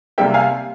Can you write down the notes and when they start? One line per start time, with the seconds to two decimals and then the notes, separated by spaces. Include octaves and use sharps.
0.18 C3 G3 A#3 E5 G5
0.34 F5 G#5